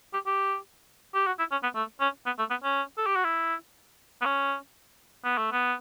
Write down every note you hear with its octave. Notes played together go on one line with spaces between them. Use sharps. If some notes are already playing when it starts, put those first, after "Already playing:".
G4
G4
G4
F#4
E4
C#4
B3
A3
C#4
B3
A3
B3
C#4
A4
G4
F#4
E4
B3
C#4
B3
A3
B3